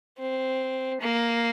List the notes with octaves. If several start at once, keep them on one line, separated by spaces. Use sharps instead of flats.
C4
A#3